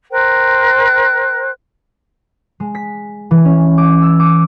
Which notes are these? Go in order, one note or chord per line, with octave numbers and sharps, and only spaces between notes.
A#4 C5 G5 F#6
G#3
B6
E3
C#4
D6
E6
D6